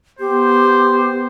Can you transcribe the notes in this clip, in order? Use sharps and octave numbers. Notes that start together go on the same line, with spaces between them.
B3 G4 C5